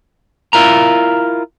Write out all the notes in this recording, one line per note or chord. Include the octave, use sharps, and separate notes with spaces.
E4 F4 A#4 A#5